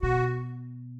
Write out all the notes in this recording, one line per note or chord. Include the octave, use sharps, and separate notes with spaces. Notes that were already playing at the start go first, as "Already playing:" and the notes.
B2 F#4